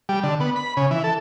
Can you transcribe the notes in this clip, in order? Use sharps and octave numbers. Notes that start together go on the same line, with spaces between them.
G3
D3
B3
B5
C#3
E3
A4